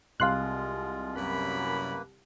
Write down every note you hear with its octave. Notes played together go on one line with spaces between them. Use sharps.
C2 G#3 F4 F5 C6 F#6
F#2 A#3 B4 B5